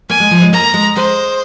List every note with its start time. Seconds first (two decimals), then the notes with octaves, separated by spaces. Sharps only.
0.09 A#3 G#5
0.20 G#3
0.31 F3
0.41 G#3
0.53 A#3 A#5
0.74 G#3
0.96 G#3 C5